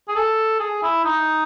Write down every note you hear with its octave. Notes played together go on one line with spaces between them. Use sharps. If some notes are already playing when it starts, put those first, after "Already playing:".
G#4
A4
G#4
E4
D#4